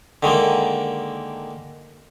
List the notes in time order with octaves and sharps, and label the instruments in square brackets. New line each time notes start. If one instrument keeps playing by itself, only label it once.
[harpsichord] D3 D#3 G#3 A#3